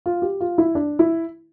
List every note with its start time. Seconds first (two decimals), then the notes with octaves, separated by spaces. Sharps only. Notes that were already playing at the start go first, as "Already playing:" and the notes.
0.06 F4
0.22 G4
0.40 F4
0.58 E4
0.75 D4
0.99 E4